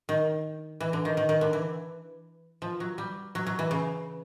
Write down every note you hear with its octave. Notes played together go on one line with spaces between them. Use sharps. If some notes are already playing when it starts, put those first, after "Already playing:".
D#3
E3
D3
D#3
D#3
D#3
D3
E3
F3
F#3
G3
F#3
F#3
E3
C#3